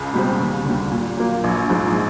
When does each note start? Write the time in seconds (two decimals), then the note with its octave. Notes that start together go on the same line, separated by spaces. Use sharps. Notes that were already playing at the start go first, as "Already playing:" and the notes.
Already playing: C#2
0.13 B2 G3 C4
0.40 D#2
0.65 D3
0.70 G3
0.91 A#2
1.17 F#3 A#3
1.44 A#1
1.70 G#2 F3 G#3